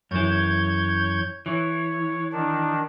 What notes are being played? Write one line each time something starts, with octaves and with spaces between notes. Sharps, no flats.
F#2 E3 C#5 G6 G#6
E3 C#5
D#3 D4